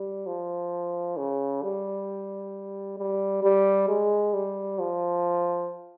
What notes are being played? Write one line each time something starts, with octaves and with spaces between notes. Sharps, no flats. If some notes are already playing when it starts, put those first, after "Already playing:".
Already playing: G3
F3
C#3
G3
G3
G3
G#3
G3
F3